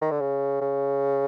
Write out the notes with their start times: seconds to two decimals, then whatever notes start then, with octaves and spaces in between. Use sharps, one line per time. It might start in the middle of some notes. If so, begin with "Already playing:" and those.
0.01 D#3
0.11 D3
0.21 C#3
0.61 C#3